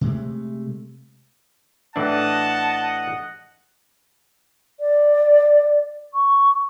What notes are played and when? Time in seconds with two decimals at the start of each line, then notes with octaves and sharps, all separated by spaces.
0.01 C3 G#3 A3
1.96 A2 E3 D4 D#5 F#5 A5
4.80 D5
6.14 C#6